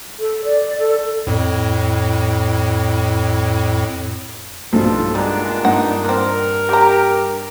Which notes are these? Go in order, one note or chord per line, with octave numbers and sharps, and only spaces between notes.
A4
D5
A4
F2 A2
B1 G2 F3 A4
A#2 G3 G#3 B3 D4 A#5
G2 D#4 F#5
A#3 C4 A#4
A#3 G4 A#5